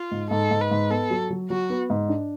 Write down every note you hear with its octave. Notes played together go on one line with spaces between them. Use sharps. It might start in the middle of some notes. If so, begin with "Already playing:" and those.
Already playing: F4
G#2
G#2 A4
G#2
B4
G#2
B3 A4
F#3
F#3
F#3 F#4
B3
G#2
D4